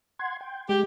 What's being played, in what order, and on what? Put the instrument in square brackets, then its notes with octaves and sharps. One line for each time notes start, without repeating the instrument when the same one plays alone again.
[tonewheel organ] F#5 C6 G#6
G5
[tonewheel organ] G#3 [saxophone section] G4